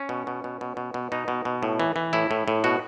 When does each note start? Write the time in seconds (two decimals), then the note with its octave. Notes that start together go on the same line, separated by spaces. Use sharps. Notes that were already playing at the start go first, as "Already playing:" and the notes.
Already playing: C#4
0.09 B2
0.27 B2
0.44 B2
0.61 B2
0.77 B2
0.94 B2
1.12 B2 D#4
1.28 B2
1.45 B2
1.63 A2
1.80 E3
1.96 E3
2.13 A2 E4
2.31 A2
2.48 A2
2.64 B2 F#4